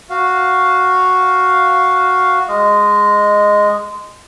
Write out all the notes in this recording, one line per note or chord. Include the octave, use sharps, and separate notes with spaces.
F#4 F5
G#3 D#5